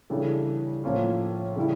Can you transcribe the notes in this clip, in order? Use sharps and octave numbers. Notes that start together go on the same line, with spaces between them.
C#3 E3 G3 D4 A4
A2 F3 A#3 C#4 F4
C#3 E3 G3 C#4 E4